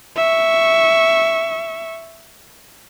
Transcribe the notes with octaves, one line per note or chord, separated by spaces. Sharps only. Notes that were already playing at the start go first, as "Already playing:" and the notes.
E5 C#6